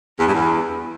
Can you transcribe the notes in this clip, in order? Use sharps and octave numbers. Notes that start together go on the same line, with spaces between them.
E2
G2
E2